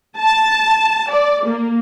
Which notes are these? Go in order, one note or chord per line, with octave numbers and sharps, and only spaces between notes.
A5
D5
A#3